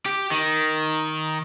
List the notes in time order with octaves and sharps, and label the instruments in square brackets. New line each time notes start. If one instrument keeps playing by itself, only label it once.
[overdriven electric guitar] G4
D#3